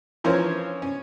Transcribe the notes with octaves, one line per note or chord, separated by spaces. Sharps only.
E3 F3 C#4 A#4 C5 C#5
C#4